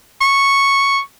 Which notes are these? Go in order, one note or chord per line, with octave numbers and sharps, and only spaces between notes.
C#6